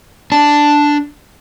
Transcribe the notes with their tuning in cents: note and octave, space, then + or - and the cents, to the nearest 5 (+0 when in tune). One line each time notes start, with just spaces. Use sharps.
D4 +0 A5 +0